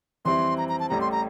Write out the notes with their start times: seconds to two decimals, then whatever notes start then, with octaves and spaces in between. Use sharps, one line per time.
0.25 F2 E3 G3 C4 E4 C6
0.58 A#5
0.69 A#5
0.80 A5
0.89 A1 A2 G3 A#5
1.01 C6
1.12 A#5